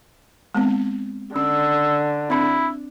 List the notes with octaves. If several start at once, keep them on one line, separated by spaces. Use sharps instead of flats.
G#3 B3 C4
D3 C#4 E6
C4 D4 E4